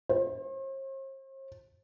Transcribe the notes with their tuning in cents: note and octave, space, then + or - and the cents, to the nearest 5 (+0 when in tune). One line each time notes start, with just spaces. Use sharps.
C5 +45